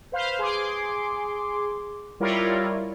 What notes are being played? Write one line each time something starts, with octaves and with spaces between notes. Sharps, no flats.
B4 C5 F5
G#4 C6 D6
G3 E4 F4 A#4 C#5 D5